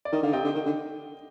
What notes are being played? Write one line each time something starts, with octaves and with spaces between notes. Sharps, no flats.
D5
D#3 D#5
D3 F5
C3 D#5 G5
D3
D#3
D3